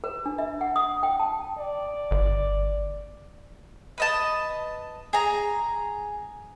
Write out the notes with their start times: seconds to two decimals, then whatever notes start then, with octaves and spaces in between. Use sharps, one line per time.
0.04 B4
0.26 D4
0.38 E5
0.61 F#5
0.76 D#6
1.03 G5
1.19 A5
1.58 D5
2.11 G1
3.98 B4 D#5 A5
5.13 G#4 A#5